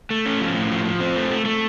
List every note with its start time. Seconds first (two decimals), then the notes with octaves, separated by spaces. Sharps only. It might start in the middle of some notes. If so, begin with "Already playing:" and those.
0.10 A3
0.26 C#4
0.41 F3
0.55 A2
0.71 F3
0.85 F3
1.00 C4
1.16 A3
1.31 A3
1.45 A3